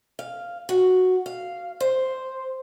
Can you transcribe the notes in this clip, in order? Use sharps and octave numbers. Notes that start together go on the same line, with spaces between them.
F5
F#4
F5
C5